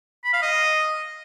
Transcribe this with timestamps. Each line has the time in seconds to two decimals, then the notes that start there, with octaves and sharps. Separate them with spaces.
0.24 B5
0.33 F5
0.42 D#5